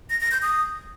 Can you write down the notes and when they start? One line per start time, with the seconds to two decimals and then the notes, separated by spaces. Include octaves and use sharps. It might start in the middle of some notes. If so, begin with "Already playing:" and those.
0.10 A#6
0.21 A#6
0.31 G6
0.42 D#6